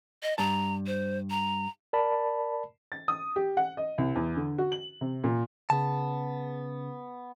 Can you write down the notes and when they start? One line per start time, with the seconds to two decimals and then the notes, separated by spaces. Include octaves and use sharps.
0.23 D#5
0.38 G2 A5 A#5
0.87 C5
1.30 A#5
1.93 A#4 D5 A5 B5
2.92 A6
3.08 D#6
3.36 G4
3.57 F#5
3.77 D#5
3.98 C2
4.15 E2
4.36 D3
4.58 F#4
4.72 F#7
5.01 C3
5.24 A#2
5.70 C#3 B3 A5